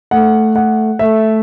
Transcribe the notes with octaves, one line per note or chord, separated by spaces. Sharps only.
A3 F#5
F#5
A3 E5